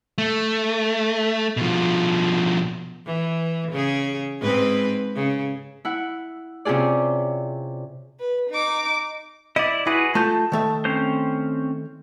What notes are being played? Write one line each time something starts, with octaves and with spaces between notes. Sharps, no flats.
A3
B2 F3
E3
C#3 G#4
G#2 C4 B4
C#3
E4 F#5
C3 C#4 F4 G#4 D5
B4
D#4 D6
E4 D5 D#5
E4 F#4 G#4 B4
A3 F4 A5 G6
D#3 A3 E5
C4 C#4 C5